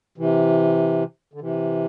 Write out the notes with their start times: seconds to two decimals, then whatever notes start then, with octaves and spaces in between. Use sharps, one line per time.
0.18 C3 E3
1.34 D3
1.41 C3 E3